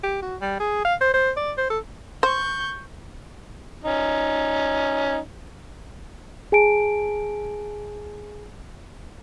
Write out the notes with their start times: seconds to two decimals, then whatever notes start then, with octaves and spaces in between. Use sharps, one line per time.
0.03 G4
0.22 F#4
0.41 G3
0.60 G#4
0.85 F5
1.01 C5
1.14 C5
1.37 D5
1.57 C5
1.70 A4
2.23 C5 C#6 G6
3.84 C#4 D#4
6.52 G#4 G#5 A5 D7